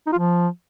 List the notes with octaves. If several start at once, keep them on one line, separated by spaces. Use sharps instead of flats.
D#4
F4
F3